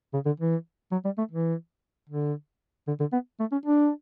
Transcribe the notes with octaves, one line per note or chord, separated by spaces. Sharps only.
C#3
D3
E3
F#3
G3
A3
E3
D3
D3
D3
B3
A3
C#4
D4